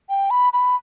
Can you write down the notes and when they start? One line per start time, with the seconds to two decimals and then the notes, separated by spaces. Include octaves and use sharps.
0.09 G5
0.30 B5
0.53 B5